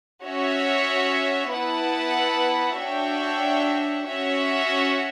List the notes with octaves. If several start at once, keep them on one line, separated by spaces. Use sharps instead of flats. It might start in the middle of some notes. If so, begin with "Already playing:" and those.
C#4 F#4 C#5 E5
B3 E4 B4 F#5 A5
D4 F#4 C#5 E5 G5
C#4 F#4 C#5 E5